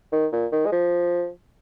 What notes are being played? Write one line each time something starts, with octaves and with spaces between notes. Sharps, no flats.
D#3
A#2
D#3
G#3
F3